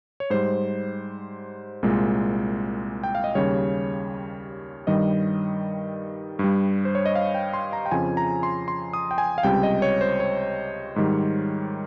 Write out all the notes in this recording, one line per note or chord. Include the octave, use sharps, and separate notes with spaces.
C#5
G#2 G3 C5
C2 A#2 G#3
G5
F5
D#5
D#2 C#3 G3 C#5
G2 D#3 G3 D#5
G2 G3
C5
C#5
D#5
F5
G5
C6
A#5
G5
F2 C#3 F3 G#5
A#5
C6
C6
D#6
G5
G#5
F5
C#2 C3 G3 G5
D#5
C#5
C5
C#5
G#2 D#3 G3